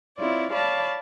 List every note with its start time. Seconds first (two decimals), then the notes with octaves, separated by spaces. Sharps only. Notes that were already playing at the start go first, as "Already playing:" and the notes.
0.17 C4 E4 F4 C#5 D5
0.52 C#5 D5 F5 A5 B5